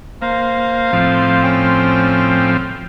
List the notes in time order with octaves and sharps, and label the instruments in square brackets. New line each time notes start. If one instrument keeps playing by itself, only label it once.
[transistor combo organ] A#3 [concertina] C5 F5
[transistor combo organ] A2 F3 C4
[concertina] C#4 C5 G5